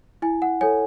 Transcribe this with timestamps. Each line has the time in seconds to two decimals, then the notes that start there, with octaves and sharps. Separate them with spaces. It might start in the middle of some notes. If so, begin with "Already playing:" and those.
0.22 E4 G#5
0.42 F#5
0.61 A4 C#5 G#5